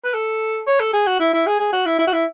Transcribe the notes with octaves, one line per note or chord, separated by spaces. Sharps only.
B4
A4
C#5
A4
G#4
F#4
E4
E4
G#4
G#4
F#4
E4
E4
F#4
E4